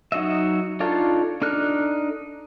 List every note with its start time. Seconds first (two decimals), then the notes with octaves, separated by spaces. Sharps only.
0.12 F#3 D#4 F#4 D#5 E5
0.80 D4 D#4 F4 A4 C#5
1.42 D4 D#4 A4 F6 F#6